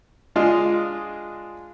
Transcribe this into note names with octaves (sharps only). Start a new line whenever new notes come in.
G#3 D4 F4 G#4 D#5